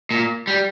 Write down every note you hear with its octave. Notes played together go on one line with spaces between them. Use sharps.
A#2
G3